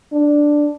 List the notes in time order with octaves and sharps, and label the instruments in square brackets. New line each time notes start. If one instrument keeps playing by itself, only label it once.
[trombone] D4